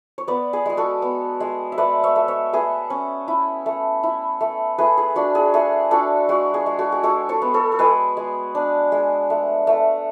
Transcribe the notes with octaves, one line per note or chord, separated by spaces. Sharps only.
C#5
B3 B4 D5
G#4
G#3 G#4
F#4 A4
B3
G#3
E5
A3 B4 D5
C#5 E5
A3
C#5 E5
A3 G#4 B4
C#4
E4
A3
E4
A3
A3 G#4 B4
G#4
D4 F#4
G#4
A3 G#4
D4 F#4 A4
G#3 F#4
G#4
G#3
F#4 A4
G#4
G#3 F#4 A4
A4 C#5
B3
A4 C#5
A4
G#3 G#4 B4
G#3
D4
G#3
A3
A3